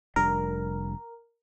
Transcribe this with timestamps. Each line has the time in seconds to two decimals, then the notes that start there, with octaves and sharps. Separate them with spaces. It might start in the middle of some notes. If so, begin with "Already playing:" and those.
0.16 F1 G3 D4 A#4